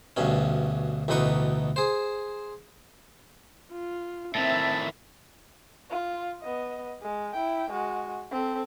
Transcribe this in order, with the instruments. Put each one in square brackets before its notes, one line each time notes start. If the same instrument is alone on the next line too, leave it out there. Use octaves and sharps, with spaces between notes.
[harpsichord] D2 G2 B2 C#4
A1 D2 B2 D#4 B4 C#6
G#4 C5
[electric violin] F4
[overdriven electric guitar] A2 D#3 [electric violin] C4 [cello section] E5 [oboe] A5
[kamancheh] F4
B3 D#5
G#3
E4 G5
G#3 F#4
C4 A4